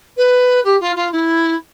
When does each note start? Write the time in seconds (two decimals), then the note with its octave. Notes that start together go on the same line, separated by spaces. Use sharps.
0.17 B4
0.64 G4
0.80 F4
0.95 F4
1.12 E4